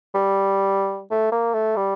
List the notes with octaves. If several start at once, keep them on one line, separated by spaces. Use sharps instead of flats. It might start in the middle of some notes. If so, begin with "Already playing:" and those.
G3
A3
A#3
A3
G3